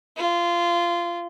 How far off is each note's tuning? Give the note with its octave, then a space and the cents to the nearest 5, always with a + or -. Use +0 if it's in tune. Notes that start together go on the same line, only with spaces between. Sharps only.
F4 -20